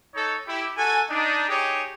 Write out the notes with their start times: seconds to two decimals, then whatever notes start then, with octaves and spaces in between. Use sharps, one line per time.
0.14 D#4 A4 C#5
0.47 E4 G4
0.77 F#4 A4 G#5
1.09 D4 D#4
1.48 D#4 G4 G#4 C#5